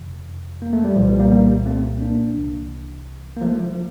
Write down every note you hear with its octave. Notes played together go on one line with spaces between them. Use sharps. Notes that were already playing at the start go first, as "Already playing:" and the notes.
Already playing: F2 C3 E3
A#3
A3
G3
C2 A#2 F3
E3 G3
G3 A#3
G3 A#3
A3 C4
A#3 D4
C2 C3 E3
A#3
F3 A3
F3